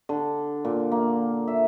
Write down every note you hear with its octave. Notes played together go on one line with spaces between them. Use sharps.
D3
A#2
A#3
E5